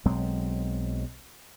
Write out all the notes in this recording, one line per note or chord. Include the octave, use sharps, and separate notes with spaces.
B1 F#3 G#3 C4